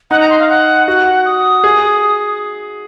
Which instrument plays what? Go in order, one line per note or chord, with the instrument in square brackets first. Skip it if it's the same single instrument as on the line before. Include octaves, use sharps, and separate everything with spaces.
[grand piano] D#4 [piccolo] F#5
[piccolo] A#5
C6
F5
F#5
[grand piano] F#4 [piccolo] F#5
[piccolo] D#6
[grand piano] G#4